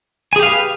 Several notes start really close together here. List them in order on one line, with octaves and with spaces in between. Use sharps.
G#5 G#4 G4 F5 B4